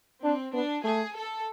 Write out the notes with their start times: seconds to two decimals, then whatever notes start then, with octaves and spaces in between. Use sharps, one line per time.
0.23 C4 D4
0.53 B3 D4
0.84 A3 G#4
1.15 A4